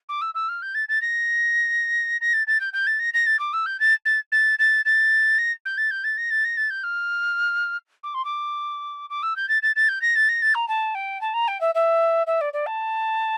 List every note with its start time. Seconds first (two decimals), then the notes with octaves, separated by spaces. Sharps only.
0.09 D6
0.21 E6
0.34 E6
0.48 F6
0.62 G6
0.75 A6
0.89 A6
1.01 A#6
2.21 A#6
2.33 A6
2.47 A6
2.60 G6
2.73 G6
2.87 A6
2.99 A#6
3.14 A#6
3.26 A6
3.39 D6
3.53 E6
3.66 G6
3.80 A6
4.05 A6
4.32 A6
4.59 A6
4.85 A6
5.38 A#6
5.65 G6
5.77 A6
5.91 G6
6.04 A6
6.17 A#6
6.30 A6
6.45 A#6
6.57 A6
6.70 G6
6.83 F6
8.03 D6
8.14 C6
8.25 D6
9.10 D6
9.23 E6
9.36 G6
9.48 A6
9.62 A6
9.76 A6
9.89 G6
10.01 A#6
10.16 A6
10.29 A#6
10.42 A6
10.54 A#5
10.68 A5
10.95 G5
11.21 A5
11.34 A#5
11.48 G5
11.61 E5
11.75 E5
12.27 E5
12.41 D5
12.53 D5
12.66 A5